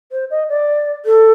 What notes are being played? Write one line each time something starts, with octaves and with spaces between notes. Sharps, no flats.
C5
D#5
D5
A4